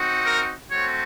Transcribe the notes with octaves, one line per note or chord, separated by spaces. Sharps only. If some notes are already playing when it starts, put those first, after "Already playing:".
Already playing: C4 D#4 F#4
A#4
A3 C4 F#4 C#5